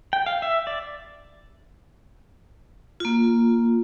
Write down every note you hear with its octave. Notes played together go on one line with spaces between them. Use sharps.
G5
F5
E5
D5
A#3 F4